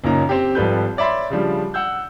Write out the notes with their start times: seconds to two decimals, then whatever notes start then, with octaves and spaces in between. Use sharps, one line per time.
0.04 F#1 A#2 A#3 C#4 D#4 A#5
0.29 C4 G4
0.55 G#1 F3 G3 A4 B4 G6
0.97 C#5 D5 E5 B5 C6
1.30 C#3 F3 G3 D4
1.74 F#5 E6 G6